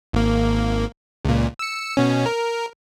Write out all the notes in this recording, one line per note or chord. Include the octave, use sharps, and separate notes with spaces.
G#1 A#3
C#2 A#2
E6 C#7
B2 C#4
A#4